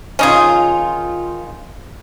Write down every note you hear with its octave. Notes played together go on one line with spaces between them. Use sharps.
D#3 C#4 D#4 F4 G#4